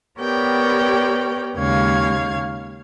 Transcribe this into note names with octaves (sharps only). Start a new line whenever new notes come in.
B3 G4 A#4 C#5 D5 G5
D#2 C#3 G#3 C#5 F5 G#6